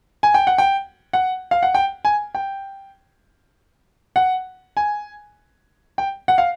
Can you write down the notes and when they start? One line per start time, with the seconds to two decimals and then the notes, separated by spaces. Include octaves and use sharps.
0.23 G#5
0.34 G5
0.47 F#5
0.58 G5
1.13 F#5
1.51 F5
1.63 F#5
1.75 G5
2.05 G#5
2.35 G5
4.16 F#5
4.77 G#5
5.98 G5
6.28 F#5
6.38 F5